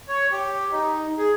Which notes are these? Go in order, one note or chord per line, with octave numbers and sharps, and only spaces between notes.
C#5
G4
D#4
G#4